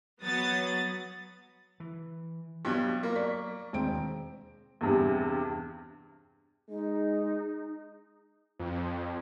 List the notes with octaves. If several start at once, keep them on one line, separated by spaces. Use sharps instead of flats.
F#3 B3 D#6 A6
E3
G2 B2 F#3
A#3
D5 C#6 B6
E1 D#2 C4 D7
E2 G2 C3
G#3 D#4
F2